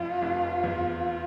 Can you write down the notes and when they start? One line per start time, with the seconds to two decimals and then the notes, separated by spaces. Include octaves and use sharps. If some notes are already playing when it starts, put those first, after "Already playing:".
Already playing: F1 F2 F4
0.22 F1
0.63 E2